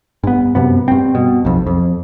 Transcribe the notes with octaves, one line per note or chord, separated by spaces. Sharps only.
G2 B3
F#2 C3 B3
G2 C4
B2
B1 F2
F2